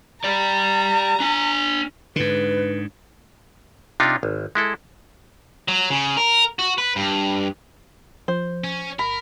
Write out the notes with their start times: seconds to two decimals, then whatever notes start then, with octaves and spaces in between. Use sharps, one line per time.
0.24 G4 D5 A#5
1.20 D4 G#5
2.16 G#2 D3 B4
4.00 C3 D4 D#4 F4
4.23 G#1
4.55 G#3 E4 A4
5.68 F#3
5.90 C#3
6.17 A#4
6.59 F#4
6.78 B4
6.96 G2
8.28 F3 C5
8.64 C#4
8.99 G1 A#4 B5